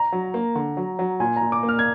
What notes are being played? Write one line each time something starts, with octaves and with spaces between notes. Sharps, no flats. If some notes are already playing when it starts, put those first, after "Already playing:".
Already playing: A#5
F#3
A#3
D3
F#3
F#3
A#2 G#5
A#2 A#5
D6
A#3
F6
G#6